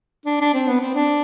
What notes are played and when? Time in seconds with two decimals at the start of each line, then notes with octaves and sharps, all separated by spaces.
0.26 D4
0.40 D4
0.53 C4
0.67 B3
0.81 C4
0.94 D4